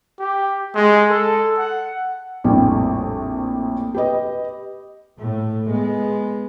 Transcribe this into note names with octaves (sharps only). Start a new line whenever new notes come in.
G4
G#3
A4
F#5
A#1 F2 A2 G3
G4 B4 D#5
A2 A3
G#3 B3